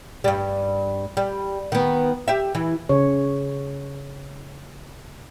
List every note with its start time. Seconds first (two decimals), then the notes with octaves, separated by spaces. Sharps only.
0.24 G2 G3
1.17 G3
1.72 D#3 B3
2.28 G4 E5
2.55 E3
2.89 C#3 C#5